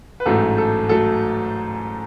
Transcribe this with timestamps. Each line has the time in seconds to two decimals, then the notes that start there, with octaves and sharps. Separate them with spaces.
0.20 B4
0.26 A1 G#2 F#3 A3 A4
0.58 A4
0.89 F#3 A3 A4